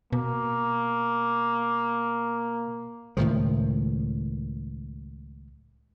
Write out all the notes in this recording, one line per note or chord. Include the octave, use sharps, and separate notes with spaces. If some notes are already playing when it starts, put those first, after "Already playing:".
B2 A#3
C#2 A2 D#3 F3